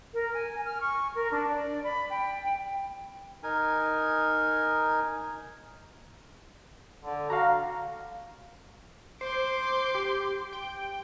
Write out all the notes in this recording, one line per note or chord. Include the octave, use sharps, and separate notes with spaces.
A#4
G#5
F6
C#6
A#4
D4
D5
B5
G5
D#4 A#4 G#5
D3
F#4 F5 A#5
C5 C6 D6
G4
G5